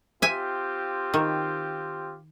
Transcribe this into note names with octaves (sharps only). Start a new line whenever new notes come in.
C4 F4 G4 E5 G#5
D#3